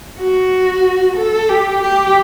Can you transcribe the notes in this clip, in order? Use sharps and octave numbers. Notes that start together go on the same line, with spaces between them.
F#4
A4
G4
G4